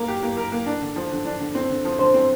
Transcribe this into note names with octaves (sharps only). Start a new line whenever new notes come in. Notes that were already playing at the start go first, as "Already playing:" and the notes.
Already playing: A#3 A#4
G4
A#3
A#4
A#3
D4
D3
F3
D3
D4
D3
C4
D3
F3
D3 C5
C4